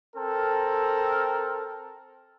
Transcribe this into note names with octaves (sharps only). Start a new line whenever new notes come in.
C4 A4 A#4